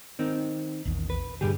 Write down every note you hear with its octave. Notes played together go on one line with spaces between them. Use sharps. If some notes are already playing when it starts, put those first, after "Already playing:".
D#3 C4 D#4
A#1 E2 D#3
B4
G2 A#2 D3 G3 G4 G#4